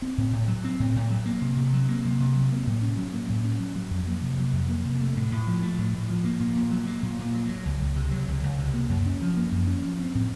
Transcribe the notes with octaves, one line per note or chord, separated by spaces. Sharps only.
C4
A2
A2
F#3
C4
A2
A2
F#3
A#3
C3
C3
F#3
A#3
C3
C3
F#3
A#3
A2
C#4
F#3
A#3
A2
C#4
F#3
F#3
F2
A#3
C3
F#3
F2
A#3
C3
A3
A2
A2
F3
A3
A2
A2
F3
A#3
A#2
A#2
F#3
A#3
A#2
A#2
F#3
F#3
C#2
C#2
C3
F#3
C#2
C#2
C3
A#3
F#2
C#4
F3
A#3
F#2
C#4
F3
C4
A2